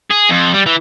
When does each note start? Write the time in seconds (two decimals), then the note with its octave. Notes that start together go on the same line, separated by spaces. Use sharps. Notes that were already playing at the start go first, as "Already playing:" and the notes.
0.10 G#4
0.29 F2
0.53 G3
0.66 E3